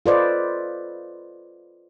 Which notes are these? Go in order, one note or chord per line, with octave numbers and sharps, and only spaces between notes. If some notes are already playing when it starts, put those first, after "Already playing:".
F4 A4 B4 C5 D5 D#5